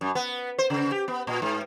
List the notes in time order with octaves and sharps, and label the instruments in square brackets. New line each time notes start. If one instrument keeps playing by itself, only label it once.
[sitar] F#2
B3
C5
C#3
G4
B3
A#2
G#2